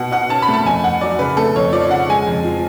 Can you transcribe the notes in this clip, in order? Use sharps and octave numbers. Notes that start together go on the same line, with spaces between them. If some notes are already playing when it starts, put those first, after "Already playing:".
Already playing: B2 F#5
B2 F#5
C#4 A5
B5
A3
A5
F2 G#5
F2 F#5
F#3 D5
C#3 B4
A3 A4
F2 C#5
F3 D5
C#3 F#5
G#3 G#5
F2
F3